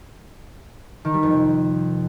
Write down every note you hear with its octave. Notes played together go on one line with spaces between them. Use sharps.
D#3
G3
F2
C3